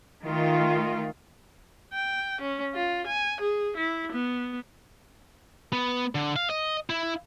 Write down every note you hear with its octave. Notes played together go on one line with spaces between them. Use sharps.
D#3 A3 F4
G5
C#4
F4
G#5
G#4
E4
B3
B3
D3
F5
D#5
E4